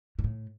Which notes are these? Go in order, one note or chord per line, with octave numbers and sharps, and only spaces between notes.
A#2
A2